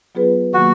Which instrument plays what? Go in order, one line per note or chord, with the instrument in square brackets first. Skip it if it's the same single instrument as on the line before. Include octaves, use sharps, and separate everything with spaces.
[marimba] F#3 B3 F4 G#4 B4
[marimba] D#3 F#3 A#3 [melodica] F#4